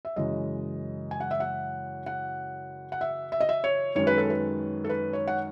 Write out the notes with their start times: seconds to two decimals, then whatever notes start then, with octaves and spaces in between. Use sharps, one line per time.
0.05 E5
0.16 F#2 C#3 E3 G#3 D#5
1.11 G#5
1.20 F#5
1.31 E5
1.40 F#5
2.06 F#5
2.92 F#5
3.01 E5
3.32 E5
3.40 D#5
3.49 E5
3.64 C#5
3.95 F#2 D#3 G#3 C#4 C#5
4.07 B4
4.18 A4
4.30 B4
4.84 A4
4.89 B4
5.13 C#5
5.28 F#5